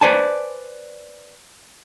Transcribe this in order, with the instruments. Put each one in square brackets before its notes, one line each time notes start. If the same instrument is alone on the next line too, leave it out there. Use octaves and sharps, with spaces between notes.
[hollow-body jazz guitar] B4 C5 D5 G#5 A5